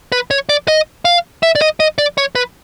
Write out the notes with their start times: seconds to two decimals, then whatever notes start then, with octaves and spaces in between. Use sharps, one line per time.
0.12 B4
0.31 C#5
0.49 D5
0.68 D#5
1.05 F5
1.43 E5
1.55 D5
1.61 D#5
1.80 D#5
1.98 D5
2.18 C#5
2.35 B4